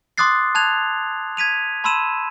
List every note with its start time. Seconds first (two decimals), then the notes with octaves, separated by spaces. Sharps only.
0.18 C6 D6 D#6 F#6 A6 C7
0.55 A5 F#6 G#6 F7
1.37 G#6 B6 D#7 F7
1.84 A5 B5 C6 E6 D#7 E7